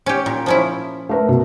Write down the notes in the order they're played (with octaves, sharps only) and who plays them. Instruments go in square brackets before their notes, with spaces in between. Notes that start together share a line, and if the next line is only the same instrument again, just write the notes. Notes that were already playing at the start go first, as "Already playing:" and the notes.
[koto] C#4 G4
A#2
F3 C#4 E4
[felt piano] A3 A#4 B4
B2